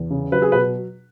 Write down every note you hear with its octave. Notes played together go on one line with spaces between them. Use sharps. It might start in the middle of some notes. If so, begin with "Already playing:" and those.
Already playing: E2
C#3
F#3 B4
G#4
B4
B2